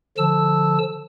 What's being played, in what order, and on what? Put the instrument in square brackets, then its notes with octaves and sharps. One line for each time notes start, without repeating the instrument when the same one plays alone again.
[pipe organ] D3 F3 A5 E6